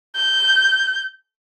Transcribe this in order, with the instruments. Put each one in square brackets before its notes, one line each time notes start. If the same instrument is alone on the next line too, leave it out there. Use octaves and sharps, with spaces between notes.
[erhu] G6